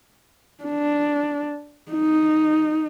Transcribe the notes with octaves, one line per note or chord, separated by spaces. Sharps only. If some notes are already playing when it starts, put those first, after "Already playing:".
D4
D#4